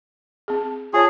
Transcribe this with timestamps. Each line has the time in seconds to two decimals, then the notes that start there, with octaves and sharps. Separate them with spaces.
0.48 C4 G#4
0.93 F4 G#4 C#5 A5